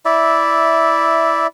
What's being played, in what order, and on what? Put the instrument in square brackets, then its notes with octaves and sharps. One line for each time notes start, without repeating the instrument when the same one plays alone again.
[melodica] E4 D5 E5